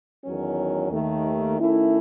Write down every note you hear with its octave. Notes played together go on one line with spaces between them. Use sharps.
E2 D#3 F#3 C#4
D#2 D#3 A3
D#3 A3 C#4 E4